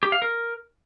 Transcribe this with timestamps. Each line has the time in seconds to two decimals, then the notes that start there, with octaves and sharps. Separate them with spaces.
0.03 G4
0.12 F5
0.22 A#4